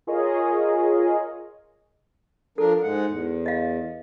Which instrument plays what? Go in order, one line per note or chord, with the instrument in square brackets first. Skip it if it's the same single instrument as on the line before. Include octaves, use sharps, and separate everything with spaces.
[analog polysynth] F4 G#4 A#4 C#5 D#5
[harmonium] F3 D4 A#4 [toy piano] A4
[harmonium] G#2 G#3 F#5
E2
[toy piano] D#5 F5